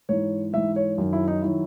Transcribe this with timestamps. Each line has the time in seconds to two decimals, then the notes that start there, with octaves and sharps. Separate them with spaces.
0.09 G#2 E3 C#5
0.53 G#2 E3 E5
0.76 C#5
0.98 F#2 D#3 F#3
1.13 E4
1.28 D#4
1.42 D#3 F#3 E4